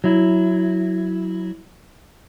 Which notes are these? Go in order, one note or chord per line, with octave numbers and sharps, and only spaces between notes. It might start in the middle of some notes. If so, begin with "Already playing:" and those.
F#3 E4